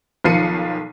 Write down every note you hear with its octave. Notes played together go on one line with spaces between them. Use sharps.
B1 D#3 F3 C7 C#7 D#7